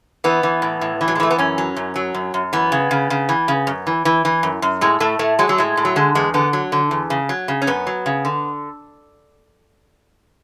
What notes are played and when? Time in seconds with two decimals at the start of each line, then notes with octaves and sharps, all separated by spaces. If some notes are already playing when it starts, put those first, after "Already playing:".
0.24 E3 B3
0.43 E3
0.62 A2
0.81 A2
1.01 E3
1.08 F#3
1.15 G#3
1.20 E3 A3
1.31 B3
1.39 F#2 C#4
1.58 F#3
1.77 F#2
1.96 F#3
2.14 F#2
2.34 F#2
2.53 E3 B3
2.72 C#3
2.91 C#3
3.10 C#3
3.29 E3
3.48 C#3
3.67 F#2
3.87 E3
4.05 E3
4.25 E3
4.43 F#2
4.62 F#2
4.81 A2 G#3
5.00 A2 A3
5.19 A2 A3
5.39 F#3 G#3
5.49 F#3
5.58 A2 G#3
5.77 A2
5.85 F#3
5.96 D3 G#3
6.15 E2 G#3
6.34 D3 B3
6.53 F#3
6.72 D3
6.91 E2
7.10 C#3
7.29 F#3
7.48 C#3
7.62 C#4
7.67 F#2 B3
7.87 F#3
8.06 C#3
8.25 D3